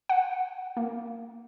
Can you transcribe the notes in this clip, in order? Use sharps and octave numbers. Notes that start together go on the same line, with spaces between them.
F#5
A#3